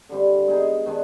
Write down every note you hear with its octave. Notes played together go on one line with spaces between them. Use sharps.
D3 G3 C4
G#3 B3 D#4 G#4
D#3 G#3 D4